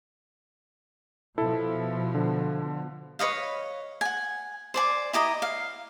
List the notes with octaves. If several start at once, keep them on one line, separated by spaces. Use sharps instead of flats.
B2 F3 E4 A4
D3
B4 C#5 D#5 F5
F#5 G#5
C5 D5 G#5
E4 G4 D#5 A#5
F5